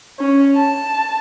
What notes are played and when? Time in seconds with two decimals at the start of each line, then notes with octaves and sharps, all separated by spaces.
0.20 C#4
0.55 A5